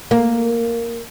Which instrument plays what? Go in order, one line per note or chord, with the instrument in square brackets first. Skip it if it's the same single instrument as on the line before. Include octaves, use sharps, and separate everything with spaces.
[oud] A#3